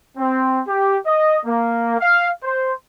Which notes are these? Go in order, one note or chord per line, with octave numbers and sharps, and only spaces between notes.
C4
G4
D#5
A#3
F5
C5